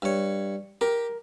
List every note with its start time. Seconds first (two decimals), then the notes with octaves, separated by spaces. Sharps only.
0.02 G2 C#5
0.81 G4 A#4